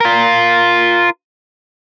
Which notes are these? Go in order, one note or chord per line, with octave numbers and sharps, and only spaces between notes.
F4 A#4